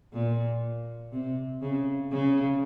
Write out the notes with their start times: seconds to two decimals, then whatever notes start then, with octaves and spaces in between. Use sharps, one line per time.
0.13 A#2
1.12 C3
1.62 C#3
2.11 C#3